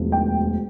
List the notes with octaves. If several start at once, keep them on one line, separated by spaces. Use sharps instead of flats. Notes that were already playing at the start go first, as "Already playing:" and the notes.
Already playing: E1 D2 F3
G5